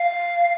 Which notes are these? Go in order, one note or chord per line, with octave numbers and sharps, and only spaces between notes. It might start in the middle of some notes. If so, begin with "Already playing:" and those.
Already playing: F5